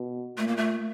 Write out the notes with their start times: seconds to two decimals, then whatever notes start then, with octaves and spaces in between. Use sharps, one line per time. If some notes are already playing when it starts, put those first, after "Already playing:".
Already playing: B2
0.38 A#2 A3
0.47 A#3
0.57 A3